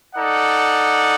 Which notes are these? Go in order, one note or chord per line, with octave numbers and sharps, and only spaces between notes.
D#4 A4 D5 F#5